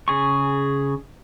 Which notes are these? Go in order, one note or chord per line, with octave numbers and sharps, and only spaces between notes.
C#3 G#4 C#6